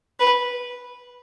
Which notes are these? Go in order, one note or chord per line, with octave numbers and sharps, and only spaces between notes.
B4